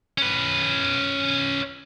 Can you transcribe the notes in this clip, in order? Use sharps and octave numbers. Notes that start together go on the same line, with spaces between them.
C#4 B4